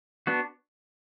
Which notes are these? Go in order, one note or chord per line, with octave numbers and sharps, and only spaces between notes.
B3 D4 F#4